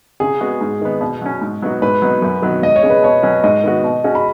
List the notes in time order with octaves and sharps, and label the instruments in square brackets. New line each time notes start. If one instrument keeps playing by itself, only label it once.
[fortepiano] C#3 [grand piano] G#4
[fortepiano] G#3 B3 F#4
G#2
D#3 B3
B2
F#3 C#4
G#2
F#3 B3 D#4 F#4
[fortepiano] G#2 [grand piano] B4
[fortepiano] F#3 B3 D#4
F#2
D#3 F#3 B3
[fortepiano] C#2 [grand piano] D#5
[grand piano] C#5
[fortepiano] C#3 G#3
[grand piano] B4
[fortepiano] B2 [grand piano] C#5
[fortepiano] F#3 C#4 F#4
[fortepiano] G#2 [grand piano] D#5
[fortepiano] D#3 B3 F#4
B2
G#3 C#4 F#4
[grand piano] B5